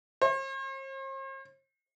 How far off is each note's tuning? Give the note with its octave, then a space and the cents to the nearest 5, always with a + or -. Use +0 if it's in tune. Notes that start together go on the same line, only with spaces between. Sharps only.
C5 +45